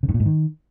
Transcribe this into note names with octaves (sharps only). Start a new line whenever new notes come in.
C#3
G2
A#2
G#2
D#3